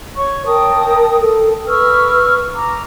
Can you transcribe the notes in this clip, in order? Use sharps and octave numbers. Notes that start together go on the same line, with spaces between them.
C#5 C#6
A#4 G5 A5 D#6
A4
B4 C#6 E6 F6
A#5 D6